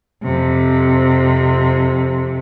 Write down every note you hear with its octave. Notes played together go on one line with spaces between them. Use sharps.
F2 C3